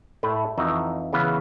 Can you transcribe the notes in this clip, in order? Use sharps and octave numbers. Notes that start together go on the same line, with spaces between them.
A2 A3 E4
F2 E3 D#4 F#4 E5
C#3 E3 B3 B4 F5